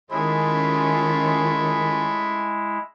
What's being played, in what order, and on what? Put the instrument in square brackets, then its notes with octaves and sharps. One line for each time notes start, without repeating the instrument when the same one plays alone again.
[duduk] D#3 [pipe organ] G#3 E4 [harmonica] A3 G#4 C#5 [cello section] C#4 F4